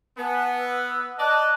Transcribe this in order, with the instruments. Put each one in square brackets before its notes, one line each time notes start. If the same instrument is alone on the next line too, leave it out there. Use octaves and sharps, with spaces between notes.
[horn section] B3 [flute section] B4 G#5 A5
[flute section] B4 E6
[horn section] D5 D#5 [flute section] A5 F#6